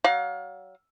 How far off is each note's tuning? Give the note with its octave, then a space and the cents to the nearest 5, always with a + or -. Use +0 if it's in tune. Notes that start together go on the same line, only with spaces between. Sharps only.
F#3 +35 F5 +30